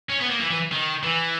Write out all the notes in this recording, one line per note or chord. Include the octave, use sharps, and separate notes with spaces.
C#4
B3
A#3
E3
E3
D#3
E3